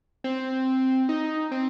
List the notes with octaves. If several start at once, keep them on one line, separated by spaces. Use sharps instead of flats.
C4
D#4
C4